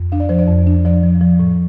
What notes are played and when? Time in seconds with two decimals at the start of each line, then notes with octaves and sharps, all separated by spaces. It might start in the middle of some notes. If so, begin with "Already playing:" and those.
Already playing: F2
0.12 D4 F5
0.20 D5
0.29 F3 C5
0.39 D5
0.48 F2
0.67 D4
0.85 F3 D5
1.03 F3
1.21 F3
1.39 A2